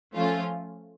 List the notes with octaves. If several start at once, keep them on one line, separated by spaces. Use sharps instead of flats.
F3 A3 C#4 F4